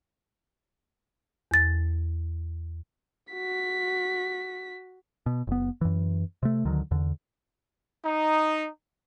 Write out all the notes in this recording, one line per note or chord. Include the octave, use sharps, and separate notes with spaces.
E2 A6
F#4 B6
B2
F#1 B3
F#2 E3
C3 A3
D2 D3 D#3 F#3
E2 D3
D#4